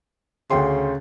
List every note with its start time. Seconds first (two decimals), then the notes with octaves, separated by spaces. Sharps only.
0.50 D2 C#3 G5 C6